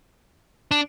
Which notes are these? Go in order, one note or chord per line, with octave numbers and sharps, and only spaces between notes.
D4